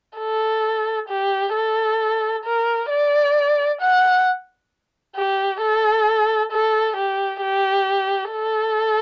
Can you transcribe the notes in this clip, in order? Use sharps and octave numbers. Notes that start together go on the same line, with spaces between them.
A4
G4
A4
A#4
D5
F#5
G4
A4
A4
G4
G4
A4